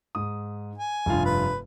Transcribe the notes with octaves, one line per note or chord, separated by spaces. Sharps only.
G#2 D#6
G#5
F1 G2 F4
B4